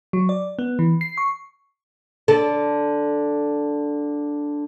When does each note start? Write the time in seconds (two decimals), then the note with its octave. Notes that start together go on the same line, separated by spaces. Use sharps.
0.13 F#3
0.29 D5
0.59 B3
0.79 E3
1.01 C7
1.18 C#6
2.28 D3 A4